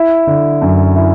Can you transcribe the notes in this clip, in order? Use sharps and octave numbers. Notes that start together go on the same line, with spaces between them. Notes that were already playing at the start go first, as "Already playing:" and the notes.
Already playing: E4
D3
F#2
E4